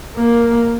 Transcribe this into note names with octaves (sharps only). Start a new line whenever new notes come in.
A#3